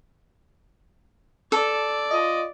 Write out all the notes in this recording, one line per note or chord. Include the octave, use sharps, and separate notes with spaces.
A4 D5
F4 D#5